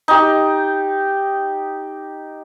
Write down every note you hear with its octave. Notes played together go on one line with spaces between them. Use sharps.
D#4 G4